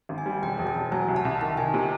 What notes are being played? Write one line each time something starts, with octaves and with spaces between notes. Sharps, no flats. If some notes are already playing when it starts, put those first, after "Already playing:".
G#1
G#5
G3
E1 G5
E1
A5
E1
F#3 G#5
C2
A5
C2
D#3 A5
D#3 G#5
C3